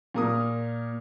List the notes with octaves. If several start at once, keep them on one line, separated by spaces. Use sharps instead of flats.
A#2 A#4 D#6